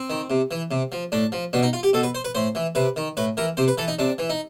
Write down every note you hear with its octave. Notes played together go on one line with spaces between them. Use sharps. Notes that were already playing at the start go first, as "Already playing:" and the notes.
Already playing: C4
D#3
C3
E3
C3
F3
A2 D4
F3
B2 D4
D#4
F4
G4
B2 A4
B4
C5
B4
A2 C5
E3
C3 B4
D#3
A2 B4
E3 A#4
C3 C5
B4
E3 A4
D#4
C3 D4
E3
D#4